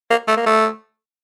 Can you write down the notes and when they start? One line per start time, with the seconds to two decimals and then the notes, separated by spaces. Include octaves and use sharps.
0.10 A#3
0.28 A3
0.37 A#3
0.46 A3